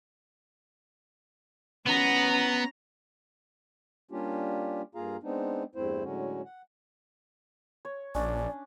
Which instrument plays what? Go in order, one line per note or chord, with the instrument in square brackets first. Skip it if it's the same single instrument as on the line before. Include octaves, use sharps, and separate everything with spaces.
[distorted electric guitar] B3 [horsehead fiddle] C#4 A#5
[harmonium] G3 A#3 C#4 D4 F4 G4
G2 A#3 F4 G#4 F5 A#5
G#3 B3 C4 D4 D#4
E2 G2 A3 C4 E4 C5
A2 D3 F#3 G#3 C#4 F#4
F#5
[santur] C#5
[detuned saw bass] A#1 [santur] C#4 D4 [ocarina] D5